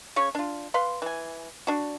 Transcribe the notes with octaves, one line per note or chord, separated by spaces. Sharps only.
C#3 C#5 C#6
D4 F4
B4 F5 C6
E3 G#5
D4 F#4